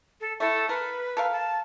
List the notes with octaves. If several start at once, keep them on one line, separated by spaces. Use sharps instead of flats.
A4
A3 E4 A4
A#4 B4
A4 A#4 F5
A5